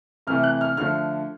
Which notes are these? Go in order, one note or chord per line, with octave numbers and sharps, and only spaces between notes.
C3 E3 A3 F6
F#6
F6
D3 F3 A3 F6